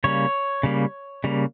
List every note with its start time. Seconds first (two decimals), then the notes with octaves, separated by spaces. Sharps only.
0.04 C#3 G3 A#3 C#5
0.63 C#3 G3 A#3
1.24 C#3 G3 A#3